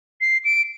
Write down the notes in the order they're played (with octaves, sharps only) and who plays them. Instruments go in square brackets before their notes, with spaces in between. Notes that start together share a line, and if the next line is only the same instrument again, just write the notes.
[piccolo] C7
D7